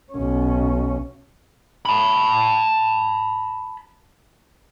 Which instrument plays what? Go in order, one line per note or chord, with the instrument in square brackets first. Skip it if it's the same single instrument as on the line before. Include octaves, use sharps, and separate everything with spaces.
[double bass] B1 C#4
[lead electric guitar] A5 B5